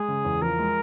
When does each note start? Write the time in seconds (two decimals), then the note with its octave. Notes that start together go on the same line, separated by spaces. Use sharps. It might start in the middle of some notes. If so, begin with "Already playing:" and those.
Already playing: G#3 G#4
0.08 C#3
0.25 E2
0.42 F3 A#4
0.59 G#3